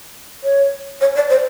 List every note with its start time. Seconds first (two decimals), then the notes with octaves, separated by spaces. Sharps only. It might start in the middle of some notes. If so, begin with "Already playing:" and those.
0.44 C#5
1.01 C#5
1.16 D5
1.30 C5